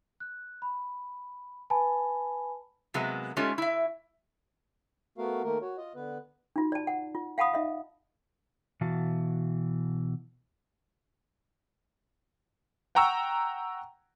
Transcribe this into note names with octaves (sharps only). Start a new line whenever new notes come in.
F#6
B5
B4 G#5 A5 B5
C3 F#3 G#3 A#3 B3
G#3 A3 C#4 D#4 F4 G4
E4 E5
A3 B3 F#4 A#4 F5
D#3 A3 A#3 A#4
F#4 C#5
F4 D#5
D3 B3 B4
D#4 F4 F#4
D5 A5
F#5
F4
F5 F#5 A5 B5 D#6
D#4 D#5 E5 B5
B2 E3 F#4 E5 F5 A5
F#5 G5 A#5 C#6 E6